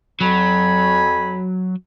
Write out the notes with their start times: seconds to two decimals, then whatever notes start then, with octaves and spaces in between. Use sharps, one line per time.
0.20 F2 F#3 G#5 B5